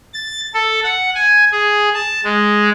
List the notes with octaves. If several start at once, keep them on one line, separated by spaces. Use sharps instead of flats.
A6
A4
F#5
G#5
G#4
A5
G#3